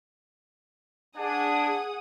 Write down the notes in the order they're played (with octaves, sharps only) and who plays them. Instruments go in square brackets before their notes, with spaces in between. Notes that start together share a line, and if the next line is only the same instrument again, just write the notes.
[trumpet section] D4 [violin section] G#4 F#5 D#6